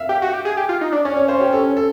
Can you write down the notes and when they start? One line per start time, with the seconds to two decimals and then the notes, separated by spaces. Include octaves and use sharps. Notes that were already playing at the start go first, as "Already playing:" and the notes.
Already playing: E5 F5
0.09 G4
0.22 F#4
0.33 G4
0.45 G#4
0.57 G4
0.69 F4
0.81 D#4
0.92 D4
1.05 C#4 D5
1.16 C#5
1.28 C5
1.40 G4
1.53 A4
1.77 A4